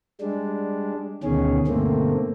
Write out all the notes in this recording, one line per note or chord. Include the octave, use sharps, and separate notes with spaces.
G3 G#3 D4
D2 B2 D#3 C#4 G#4
G2 B2 D3 A3 A#3 C4